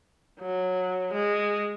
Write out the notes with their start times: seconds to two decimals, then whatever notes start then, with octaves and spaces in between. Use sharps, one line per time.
0.40 F#3
1.13 G#3